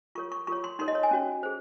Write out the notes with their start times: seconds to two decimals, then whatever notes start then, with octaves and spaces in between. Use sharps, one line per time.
0.15 F4 A#4 C#5 C#6
0.32 C#6
0.47 F4 A#4 C#5 C#6
0.64 C6
0.79 D#4 A#4 C#5 C6
0.88 D#5
0.95 C#5
1.03 G#5
1.11 C#4 F#4 C#5
1.43 G#4 C5